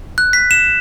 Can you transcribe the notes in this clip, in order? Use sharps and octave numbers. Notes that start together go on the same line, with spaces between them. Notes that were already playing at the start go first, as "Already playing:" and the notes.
F#6
B6
E7